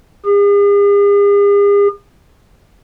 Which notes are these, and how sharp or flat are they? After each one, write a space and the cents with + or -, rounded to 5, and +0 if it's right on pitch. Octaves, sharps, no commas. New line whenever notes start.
G#4 -45